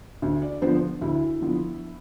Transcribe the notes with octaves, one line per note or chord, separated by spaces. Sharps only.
D2
D5
D3 F3 B3 C5
D2 E4
D3 F3 B3